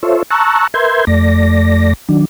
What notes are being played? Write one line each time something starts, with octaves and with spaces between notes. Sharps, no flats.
F4 A4 C5 C#5 E5
A5 A#5 C#6 E6 F#6
A#4 B4 E5 C6 G6 G#6
F2 A3 D5 A#6
D#3 F#3 D4